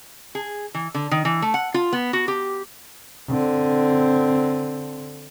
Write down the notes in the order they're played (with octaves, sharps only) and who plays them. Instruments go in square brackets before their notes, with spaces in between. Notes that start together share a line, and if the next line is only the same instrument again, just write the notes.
[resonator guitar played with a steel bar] G#4
E3
D3
D#3
E3
A3
F#5
F4
B3
F#4
G4
[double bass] D3 C4